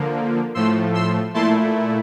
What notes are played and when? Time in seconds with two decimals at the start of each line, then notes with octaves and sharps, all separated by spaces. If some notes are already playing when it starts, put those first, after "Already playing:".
Already playing: D3 F3 A#3
0.54 A2 F3 A3 C6 E6
0.94 C6 E6
1.34 A#2 A3 E4 A5 C6